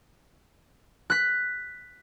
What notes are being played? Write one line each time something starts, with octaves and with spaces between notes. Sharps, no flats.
F#6 B6